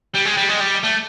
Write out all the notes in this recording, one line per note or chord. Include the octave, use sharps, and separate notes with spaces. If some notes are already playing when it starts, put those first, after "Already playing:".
G3
G#3
G3
G#3
G3
A3